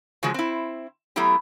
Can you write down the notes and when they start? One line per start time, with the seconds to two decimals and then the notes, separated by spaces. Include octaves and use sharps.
0.23 C#3 F3 F#3 G#3
0.34 C4 E4
1.16 F#3 A3 B3 E4 G4